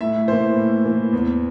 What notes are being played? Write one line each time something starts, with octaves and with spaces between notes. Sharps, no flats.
A2 E5
E3 A#3 C5
A2
E3 A#3
E2